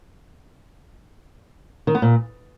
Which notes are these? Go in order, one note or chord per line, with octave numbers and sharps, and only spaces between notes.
D#3
B3
A#2